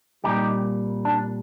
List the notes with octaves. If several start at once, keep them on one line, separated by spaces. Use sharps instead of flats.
C2 A#2 G3 D#4 G4
D4